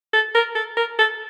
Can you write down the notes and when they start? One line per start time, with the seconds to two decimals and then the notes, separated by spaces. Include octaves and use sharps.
0.13 A4
0.35 A#4
0.55 A4
0.77 A#4
0.98 A4